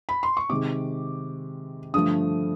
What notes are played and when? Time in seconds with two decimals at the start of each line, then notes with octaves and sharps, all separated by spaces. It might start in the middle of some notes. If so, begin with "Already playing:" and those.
0.09 B5
0.23 C6
0.37 C#6
0.49 C3 D#3 G#3 D6
1.94 G2 D3 F3 A3 D#6